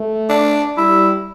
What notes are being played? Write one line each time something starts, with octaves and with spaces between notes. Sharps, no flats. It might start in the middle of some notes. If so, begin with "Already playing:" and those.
Already playing: A3
D4
G3 E4